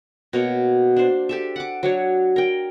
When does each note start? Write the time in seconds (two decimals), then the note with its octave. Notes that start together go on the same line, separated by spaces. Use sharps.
0.33 B2 A#3 C#5
0.96 D4 C5
1.29 G4 A4 E5
1.56 F#5 D6
1.83 F#3 D4 C#5
2.36 A#4 G5